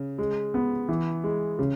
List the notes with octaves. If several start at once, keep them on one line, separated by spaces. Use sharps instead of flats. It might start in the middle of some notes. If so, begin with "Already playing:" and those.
Already playing: C#3
G#3
B3
E3
G#3
C#3